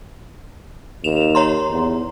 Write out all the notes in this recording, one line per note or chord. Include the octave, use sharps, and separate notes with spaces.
D#2 E7 F7
C#5 A#5 C6
E2